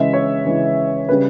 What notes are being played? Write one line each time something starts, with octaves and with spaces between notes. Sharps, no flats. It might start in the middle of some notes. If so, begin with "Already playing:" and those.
Already playing: C#3 E3 G#3 E5
C#5
C#3 E3 G#3
C#3 G3 B4